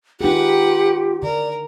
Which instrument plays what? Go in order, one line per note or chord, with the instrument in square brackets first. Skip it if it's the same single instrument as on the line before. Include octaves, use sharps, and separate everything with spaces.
[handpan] D#4 G#4 [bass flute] F4 [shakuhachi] G4 [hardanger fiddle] B4 F#5
[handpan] D3 [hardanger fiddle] A#4 [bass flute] D5